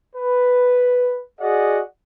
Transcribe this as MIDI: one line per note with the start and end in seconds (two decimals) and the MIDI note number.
0.16 1.21 71
1.41 1.80 66
1.41 1.80 68
1.41 1.80 74
1.41 1.80 75
1.41 1.80 78